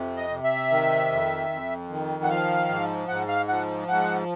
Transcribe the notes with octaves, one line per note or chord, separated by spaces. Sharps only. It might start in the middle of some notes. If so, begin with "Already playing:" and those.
Already playing: F2 C3
D#5
C3
E5
D#3
F2
F2
D#3
F#5
F3 F5
G#2
G#2 F#5
F5
F3 F#5
G#2 F#5